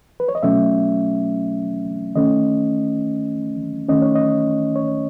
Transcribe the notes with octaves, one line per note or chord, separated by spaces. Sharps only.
B4
C#5
D#5
B2 F#3 A3 C#4 E5
D#3 A3 C#4 D#5
D#3 A3 C#4 D#5
C#5
D#5
C#5